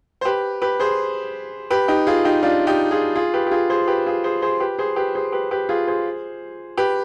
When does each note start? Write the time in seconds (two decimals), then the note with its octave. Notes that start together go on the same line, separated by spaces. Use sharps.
0.21 C5
0.25 G4 B4
0.62 G4 B4
0.80 G#4 C5
1.70 G4 B4
1.88 D#4 G4
2.07 F4 G#4
2.25 D#4 G4
2.43 D4 F4
2.67 D#4 G4
2.91 F4 G#4
3.15 F4 G#4
3.34 G4 B4
3.47 G4
3.51 F4 G#4
3.70 G#4 C5
3.88 G4 B4
4.06 F4 G#4
4.24 G#4 C5
4.42 G#4 C5
4.60 G4 B4
4.79 G#4 C5
4.96 G4 B4
5.15 G#4 C5
5.32 G4 B4
5.51 G4 B4
5.69 F4 G#4
5.88 G#4 C5
6.77 G4 B4